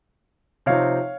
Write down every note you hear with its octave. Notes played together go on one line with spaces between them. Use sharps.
C3 F3 C4 D#4 C#5 F5